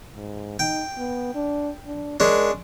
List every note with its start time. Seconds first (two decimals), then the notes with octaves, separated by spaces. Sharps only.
0.16 G#2
0.59 D#4 G5
0.98 B3
1.35 D4
1.86 D4
2.20 G#3 C#4 D4 A#4